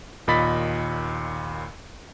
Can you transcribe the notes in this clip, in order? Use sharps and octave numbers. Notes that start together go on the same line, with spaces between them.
D#2 A#2 D#5 B5 A6 B6